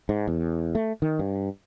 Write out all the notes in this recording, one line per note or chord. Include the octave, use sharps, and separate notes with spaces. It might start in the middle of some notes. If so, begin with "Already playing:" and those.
G#2
E2
A3
D#3
G2